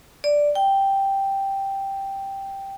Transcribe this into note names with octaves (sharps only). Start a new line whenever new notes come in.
D5
G5